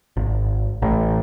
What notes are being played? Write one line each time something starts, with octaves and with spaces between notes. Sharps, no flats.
G#1
A1